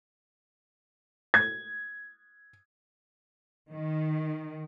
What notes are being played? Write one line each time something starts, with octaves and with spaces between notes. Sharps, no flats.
G#6
D#3